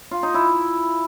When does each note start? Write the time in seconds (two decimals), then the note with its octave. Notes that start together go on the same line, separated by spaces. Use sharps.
0.11 F4
0.23 D#4
0.34 E4